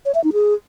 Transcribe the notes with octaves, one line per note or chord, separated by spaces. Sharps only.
C#5
E5
D#4
G#4